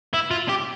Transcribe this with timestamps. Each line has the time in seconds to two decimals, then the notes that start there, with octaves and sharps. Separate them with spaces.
0.14 E4
0.31 F4
0.49 G4